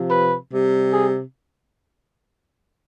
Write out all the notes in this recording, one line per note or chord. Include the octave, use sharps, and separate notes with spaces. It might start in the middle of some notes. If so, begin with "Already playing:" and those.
Already playing: C3 F3
B4
C3 G3
G#4